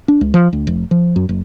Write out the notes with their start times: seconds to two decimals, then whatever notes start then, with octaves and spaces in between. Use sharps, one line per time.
0.08 D4
0.21 C#2
0.34 F3
0.53 D2
0.67 F1
0.91 F3
1.16 F#2
1.29 F#1